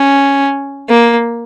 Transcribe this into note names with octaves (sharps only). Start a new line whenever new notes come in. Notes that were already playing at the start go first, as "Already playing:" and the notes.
Already playing: C#4
A#3